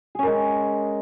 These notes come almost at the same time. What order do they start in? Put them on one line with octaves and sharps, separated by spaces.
G#4 C#4 A#4 G#3